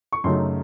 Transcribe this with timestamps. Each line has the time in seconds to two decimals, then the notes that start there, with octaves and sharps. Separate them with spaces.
0.13 C#6
0.24 F#2 C#3 F#3 A3 D#4 C6